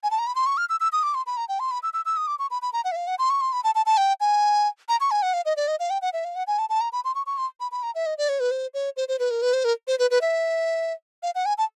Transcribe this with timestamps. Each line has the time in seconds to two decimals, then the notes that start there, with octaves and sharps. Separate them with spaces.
0.03 G#5
0.11 A5
0.19 A#5
0.27 B5
0.35 C6
0.46 C#6
0.57 F6
0.69 E6
0.80 E6
0.92 D#6
1.03 D6
1.14 C6
1.26 B5
1.37 A#5
1.49 G5
1.60 C6
1.71 B5
1.83 E6
1.93 E6
2.05 E6
2.17 D#6
2.27 D6
2.39 C#6
2.50 B5
2.62 B5
2.73 A#5
2.84 F#5
2.92 E5
2.96 F5
3.07 F#5
3.19 C6
3.30 C#6
3.41 C6
3.53 B5
3.64 A5
3.75 A5
3.86 A5
3.97 G5
4.20 G#5
4.89 A#5
5.00 C#6
5.11 G#5
5.22 F#5
5.33 F5
5.45 D#5
5.57 D5
5.68 D#5
5.79 F5
5.90 G5
6.02 F#5
6.13 E5
6.24 F5
6.35 F#5
6.47 G#5
6.59 A5
6.69 A5
6.81 A#5
6.92 B5
7.04 C6
7.15 C#6
7.26 C#6
7.38 C6
7.60 B5
7.71 B5
7.83 A#5
7.95 E5
8.06 D#5
8.18 D5
8.29 C#5
8.40 B4
8.51 C5
8.74 C#5
8.96 C5
9.08 C5
9.19 B4
9.31 A#4
9.42 B4
9.53 C5
9.64 A#4
9.87 C5
9.99 B4
10.10 B4
10.21 E5
11.23 F5
11.35 F#5
11.45 G#5
11.58 A5